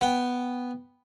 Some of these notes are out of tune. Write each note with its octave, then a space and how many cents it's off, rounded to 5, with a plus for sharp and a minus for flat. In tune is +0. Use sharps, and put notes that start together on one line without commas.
B3 +0 G5 +0